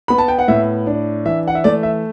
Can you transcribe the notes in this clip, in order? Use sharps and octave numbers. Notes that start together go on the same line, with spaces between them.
B3 B5
A5
G5
F#5
A2 E5
D4
E3 E5
F#5
E5
A3 D5
E5